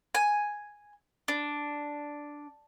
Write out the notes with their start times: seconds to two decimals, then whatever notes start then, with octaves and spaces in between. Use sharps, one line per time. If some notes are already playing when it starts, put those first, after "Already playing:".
0.15 G#5
1.28 D4